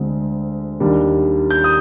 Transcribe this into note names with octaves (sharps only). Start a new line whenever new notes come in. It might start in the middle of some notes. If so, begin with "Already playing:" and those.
Already playing: D2 D3 G#3 C4
D#2 D#3 G3 D4
G6
D#6